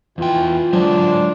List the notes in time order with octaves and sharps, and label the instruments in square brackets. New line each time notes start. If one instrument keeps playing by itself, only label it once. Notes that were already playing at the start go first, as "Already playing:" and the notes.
[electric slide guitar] E2 G5 [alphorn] E3 [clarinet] F4
[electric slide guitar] D3 G#3 C5 [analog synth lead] F#3 [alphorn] D4